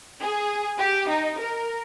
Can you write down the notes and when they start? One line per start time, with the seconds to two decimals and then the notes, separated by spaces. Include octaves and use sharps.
0.22 G#4
0.79 G4
1.10 D#4
1.40 A#4